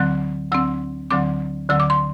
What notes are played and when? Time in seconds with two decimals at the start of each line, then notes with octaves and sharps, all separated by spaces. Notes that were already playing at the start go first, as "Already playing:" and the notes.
Already playing: D2 D3 F#3 C4 F#6
0.52 D2 D3 F#3 C4 E6
1.11 D2 D3 F#3 C4 D6
1.69 D2 D3 F#3 C4 E6
1.80 D6
1.90 C6